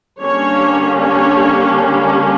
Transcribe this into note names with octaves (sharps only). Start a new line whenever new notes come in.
D3 G3 A#3 C#4 C#5
C#5
C#5